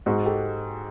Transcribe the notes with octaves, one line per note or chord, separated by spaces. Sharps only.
G#2 F#4 G#4
G4 A4